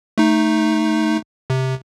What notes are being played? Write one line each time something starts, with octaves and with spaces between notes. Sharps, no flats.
A3 D#4
C3